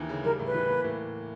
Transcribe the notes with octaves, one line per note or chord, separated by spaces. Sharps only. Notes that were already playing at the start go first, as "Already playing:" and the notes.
Already playing: D#2 D3 E3
C#3
G3 A#4
A2
B4
E3
A#3
A2